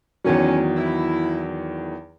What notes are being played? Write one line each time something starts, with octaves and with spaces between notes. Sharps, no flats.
E2 D#3 F#3 C#4
E4